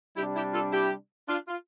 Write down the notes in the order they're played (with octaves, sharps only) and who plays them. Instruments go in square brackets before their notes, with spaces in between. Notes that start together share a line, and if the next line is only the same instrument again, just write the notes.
[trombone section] C3 G3 D4 [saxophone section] E4 G4
[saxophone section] E4 G4
F4 A4
E4 G4
D4 F4
F4